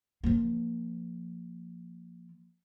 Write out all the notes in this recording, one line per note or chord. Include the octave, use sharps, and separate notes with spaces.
F3 A#3